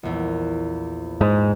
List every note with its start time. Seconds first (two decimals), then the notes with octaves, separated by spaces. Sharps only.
0.03 A#1 E2
1.21 G#2